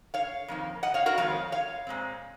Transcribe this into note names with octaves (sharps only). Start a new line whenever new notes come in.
C#5 F5
F2 D#3 A#3
D#5 F#5
C#5 F5
F#4 A#4
F2 D#3 G#3 C#5 F5
C#5 F5
A#2 G#3 C4